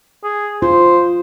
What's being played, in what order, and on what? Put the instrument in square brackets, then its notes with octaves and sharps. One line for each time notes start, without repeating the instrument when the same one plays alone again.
[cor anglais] G#4
[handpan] F4 [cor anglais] C5